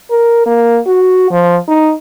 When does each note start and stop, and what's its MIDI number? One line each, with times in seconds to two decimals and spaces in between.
0.10 0.45 70
0.46 0.78 58
0.87 1.29 66
1.31 1.56 53
1.68 1.92 63